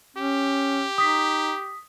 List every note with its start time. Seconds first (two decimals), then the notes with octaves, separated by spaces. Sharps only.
0.17 C#4 G4
0.98 D#4 D#6 B6